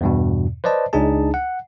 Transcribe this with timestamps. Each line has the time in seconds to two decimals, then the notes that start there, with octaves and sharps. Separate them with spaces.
0.01 E2 G2 B2
0.64 B4 C5 D5 D#5 A5
0.93 C#2 D4 D#4 G#4 A5
1.34 F#5